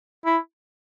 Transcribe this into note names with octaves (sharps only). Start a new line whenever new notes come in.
E4